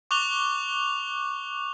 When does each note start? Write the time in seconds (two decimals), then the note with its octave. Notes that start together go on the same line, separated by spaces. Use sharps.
0.11 C#6 D6 F#6 F7 G7